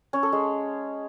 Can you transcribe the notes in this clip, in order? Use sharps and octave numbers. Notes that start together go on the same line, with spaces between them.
C#4
A4
G#3